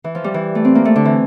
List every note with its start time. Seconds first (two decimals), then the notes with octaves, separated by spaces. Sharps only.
0.04 E3
0.15 F3
0.24 G3
0.34 E3
0.55 A3
0.65 C4
0.75 A#3
0.85 A3
0.96 D3
1.05 E3